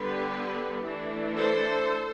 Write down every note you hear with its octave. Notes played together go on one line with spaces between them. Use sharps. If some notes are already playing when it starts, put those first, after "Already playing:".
Already playing: D3 G3 B3 G4 B4
E3 A3 D4
A4 C5